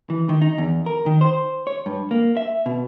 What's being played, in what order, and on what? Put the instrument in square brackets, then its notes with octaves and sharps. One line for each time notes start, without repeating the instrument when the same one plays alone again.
[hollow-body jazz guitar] E3
D#3
D#4
E2
A#4
D#3
C5
C#5
G2
A#3
E5
B2